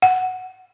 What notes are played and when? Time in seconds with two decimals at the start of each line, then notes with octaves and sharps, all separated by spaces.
0.02 F#5